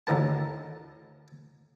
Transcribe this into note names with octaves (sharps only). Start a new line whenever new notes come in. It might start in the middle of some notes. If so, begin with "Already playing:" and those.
D2 A2 D#3 A#4 A5